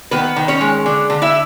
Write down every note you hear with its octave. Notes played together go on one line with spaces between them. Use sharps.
D#3 B3 B4
D#3
C#4 C#5
G#3
D3
D3
E4 E5